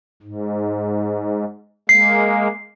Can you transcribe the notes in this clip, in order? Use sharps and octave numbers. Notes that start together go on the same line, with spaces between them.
G#2
G#3 A#3 C7